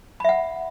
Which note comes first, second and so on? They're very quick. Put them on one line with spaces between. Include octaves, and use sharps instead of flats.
B5 E5 F#5